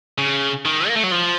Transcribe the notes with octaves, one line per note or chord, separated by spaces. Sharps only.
C#3
D#3
A#3
A3
F#3
F3